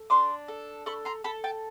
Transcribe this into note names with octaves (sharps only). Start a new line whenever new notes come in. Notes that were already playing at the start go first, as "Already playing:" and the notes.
Already playing: A4
D4 C6 D6
A4
A4 B5 C#6
A#5 C6
A4 A5 B5
G5 A5